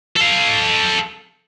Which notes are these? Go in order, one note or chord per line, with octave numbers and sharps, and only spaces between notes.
A4 F5